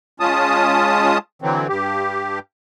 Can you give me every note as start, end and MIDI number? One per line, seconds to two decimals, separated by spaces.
0.20 1.18 56
0.20 1.18 61
0.20 1.18 65
0.20 1.18 81
0.20 1.18 87
1.42 1.67 50
1.42 1.67 52
1.42 1.67 54
1.42 1.67 60
1.68 2.39 43
1.68 2.39 67